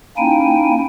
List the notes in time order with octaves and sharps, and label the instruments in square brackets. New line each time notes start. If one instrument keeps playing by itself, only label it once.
[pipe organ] A#3 C#4 D#4 E4 G5 G#5